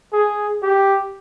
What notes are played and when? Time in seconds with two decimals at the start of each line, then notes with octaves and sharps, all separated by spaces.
0.13 G#4
0.62 G4